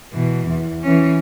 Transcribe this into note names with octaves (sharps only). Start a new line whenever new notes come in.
B2 E3
E2
E3 C#4